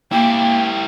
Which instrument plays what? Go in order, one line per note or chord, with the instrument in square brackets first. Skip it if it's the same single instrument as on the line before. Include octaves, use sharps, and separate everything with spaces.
[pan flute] A#3 [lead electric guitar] E4 G4 [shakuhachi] G5